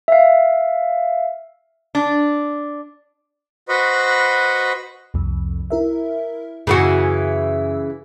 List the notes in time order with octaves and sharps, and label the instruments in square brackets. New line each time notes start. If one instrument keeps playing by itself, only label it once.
[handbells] E5 F5
[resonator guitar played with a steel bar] D4
[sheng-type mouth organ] F#4 B4 C5 D#5 B5 C#6
[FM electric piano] C2 F2
E4 A#4 E5
[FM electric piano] F#2 E6 [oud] C#3 E3 F#4